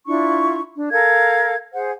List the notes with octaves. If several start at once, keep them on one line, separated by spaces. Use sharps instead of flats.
D4 E4 F4 C#6
D4
A4 A#4 F5 G#6
G#4 C5 F#5